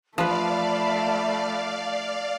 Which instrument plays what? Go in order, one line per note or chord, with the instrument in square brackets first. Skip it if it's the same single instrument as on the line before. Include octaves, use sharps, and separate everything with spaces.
[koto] F3 B4 [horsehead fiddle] A3 [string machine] D5 F5 [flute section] E5 A5 B5